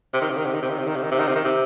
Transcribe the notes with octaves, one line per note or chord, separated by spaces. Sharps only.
C3
D#3
C3
D#3
C3
D#3
C3
D#3
C3
D#3
C3
D#3
C3
D#3
C3
D#3
C3